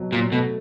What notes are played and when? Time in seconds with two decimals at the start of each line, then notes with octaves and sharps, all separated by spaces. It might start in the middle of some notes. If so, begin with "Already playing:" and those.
Already playing: B2 F#3
0.12 A#2 F#3
0.32 B2 A3